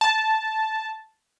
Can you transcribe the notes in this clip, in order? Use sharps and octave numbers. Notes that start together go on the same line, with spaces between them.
A5